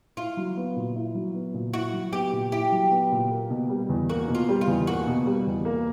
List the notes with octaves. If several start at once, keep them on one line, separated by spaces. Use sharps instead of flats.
E4 F4
F#3
B3
A#2
E4
F#3
B3
A#2
E4 F#4
F#3
B3 G4
A#2
E4 G4
F#3
B3
A#2
A#3
B2
G3
E2
A#3 F#4
B2
F4
G3
F4
E2
A#3 F#4
B2
G3
E2
A#3